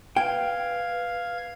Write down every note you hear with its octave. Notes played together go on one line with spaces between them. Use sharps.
B4 F5 G5 G#6